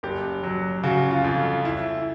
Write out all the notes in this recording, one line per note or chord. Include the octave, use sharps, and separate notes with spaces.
F#1 G4
F#3
C#3 F#4
F4
F2
E4